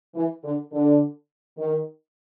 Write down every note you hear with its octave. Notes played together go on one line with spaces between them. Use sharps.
E3
D3
D3
D#3